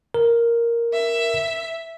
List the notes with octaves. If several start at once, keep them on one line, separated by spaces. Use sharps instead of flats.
A#4
E5